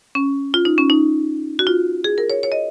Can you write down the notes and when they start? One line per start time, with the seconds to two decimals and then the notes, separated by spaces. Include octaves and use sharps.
0.15 C#4
0.54 F4
0.65 D#4
0.78 C#4
0.90 D#4
1.59 F#4
1.67 F4
2.04 G#4
2.18 A#4
2.30 C#5
2.43 C#5
2.52 D#5